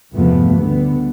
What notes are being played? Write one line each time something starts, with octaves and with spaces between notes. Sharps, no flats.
E2 G2 C3 F3 A3 B3
D2 D3 G3 B3